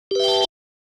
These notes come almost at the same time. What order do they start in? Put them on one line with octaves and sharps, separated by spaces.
G4 B4 E5 G5 A5